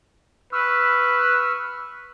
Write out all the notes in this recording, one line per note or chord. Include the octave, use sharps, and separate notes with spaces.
B4 C#6 E6 F6